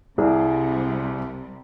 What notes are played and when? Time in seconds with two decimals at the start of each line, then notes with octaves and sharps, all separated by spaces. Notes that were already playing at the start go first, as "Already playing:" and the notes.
0.18 C2 C3 G3 G#4